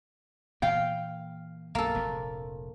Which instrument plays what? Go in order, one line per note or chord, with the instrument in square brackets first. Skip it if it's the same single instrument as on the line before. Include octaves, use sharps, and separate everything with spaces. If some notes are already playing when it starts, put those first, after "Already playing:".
[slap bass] A#2 E3 A#3 [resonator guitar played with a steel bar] F5 G5
[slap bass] B1 F#2 [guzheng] A#3 A4
[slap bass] F1 A#1 F2